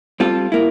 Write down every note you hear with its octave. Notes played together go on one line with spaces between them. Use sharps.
G3 C4 F4 A4
A#3 E4